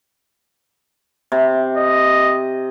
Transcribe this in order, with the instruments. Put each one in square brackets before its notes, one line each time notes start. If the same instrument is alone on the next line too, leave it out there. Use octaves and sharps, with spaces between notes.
[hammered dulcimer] C3
[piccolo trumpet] D#5